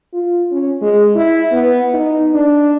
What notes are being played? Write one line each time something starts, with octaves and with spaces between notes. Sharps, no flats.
F4
C#4
G#3
E4
B3
D#4
D4